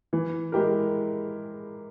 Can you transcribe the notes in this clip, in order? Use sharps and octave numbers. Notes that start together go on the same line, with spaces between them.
E3
G#3 E4 G4 A#4